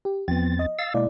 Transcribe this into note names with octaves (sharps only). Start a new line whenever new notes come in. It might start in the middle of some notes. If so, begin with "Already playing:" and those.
G4
E2 F3 B3 C4 A6
D#5
F5 E6 A6
B2 G#3 A#3 E4 D5